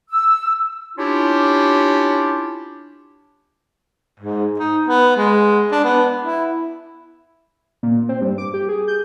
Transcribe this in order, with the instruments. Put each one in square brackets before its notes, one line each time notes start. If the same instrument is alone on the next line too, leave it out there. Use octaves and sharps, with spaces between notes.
[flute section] E6
[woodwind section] C#4 D4 E4 F4 G4
[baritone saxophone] G#2
D#4
B3
G#3
D4
B3
E4
[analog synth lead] A#2
C4
G2
D6
G4
G#4
G6